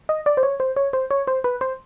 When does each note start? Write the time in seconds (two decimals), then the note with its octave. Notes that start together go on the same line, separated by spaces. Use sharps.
0.09 D#5
0.26 D5
0.37 C5
0.43 C#5
0.60 C5
0.76 C#5
0.93 C5
1.11 C#5
1.27 C5
1.44 B4
1.61 C5